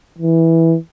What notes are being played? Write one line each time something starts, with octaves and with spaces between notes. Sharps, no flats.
E3